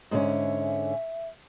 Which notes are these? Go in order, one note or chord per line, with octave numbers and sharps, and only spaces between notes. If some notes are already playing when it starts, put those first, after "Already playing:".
G#2 D3 C#4 E5